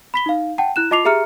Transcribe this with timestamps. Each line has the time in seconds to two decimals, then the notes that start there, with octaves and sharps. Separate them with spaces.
0.14 B5 B6 G7
0.26 D#4 F5
0.58 F#5 G5 A5
0.76 E4 F#6 E7
0.91 F4 D#5 A5 D6 C7 F7
1.05 G4 G#4 E5 A#5 F6 C#7